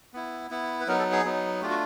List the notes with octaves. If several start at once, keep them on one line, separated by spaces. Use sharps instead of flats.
B3 E4
B3 E4
B4
F#3 B3 D#4 A#4
A4
G#4
F#3 B3 D#4
A3 D4 F4 G4
F#4